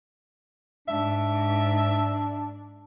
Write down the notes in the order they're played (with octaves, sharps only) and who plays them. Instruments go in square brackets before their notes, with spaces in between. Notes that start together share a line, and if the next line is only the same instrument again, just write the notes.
[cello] G#2 [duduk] D4 [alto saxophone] E5